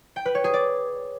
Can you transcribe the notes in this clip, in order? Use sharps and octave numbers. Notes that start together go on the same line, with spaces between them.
G5
B4
C#5
G#4
D5